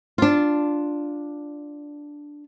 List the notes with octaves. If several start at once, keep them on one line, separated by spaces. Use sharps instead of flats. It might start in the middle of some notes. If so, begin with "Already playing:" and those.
D4 F4